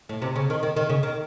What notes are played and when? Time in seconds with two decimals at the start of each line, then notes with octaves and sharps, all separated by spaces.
0.09 A2
0.22 C3
0.36 C#3
0.50 D#3
0.63 D#3
0.76 D#3
0.89 C#3
1.03 D#3